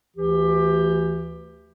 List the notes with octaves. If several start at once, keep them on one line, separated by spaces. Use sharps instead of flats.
D2 E3 G4